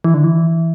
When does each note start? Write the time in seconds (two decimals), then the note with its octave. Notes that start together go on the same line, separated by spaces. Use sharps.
0.04 E3
0.14 D3
0.24 E3